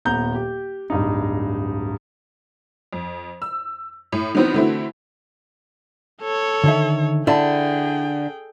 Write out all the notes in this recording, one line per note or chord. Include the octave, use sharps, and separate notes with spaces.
D#1 B3 A#5 G6
G4
D1 G2 D#4
F2
E6
A2
D#3 E3 F#3 B3 C4
D3 E3 A3 C4 E4 F#4
A4 C#5
D3 D#3 E5
D3 E4 G#4 G5 A5 B5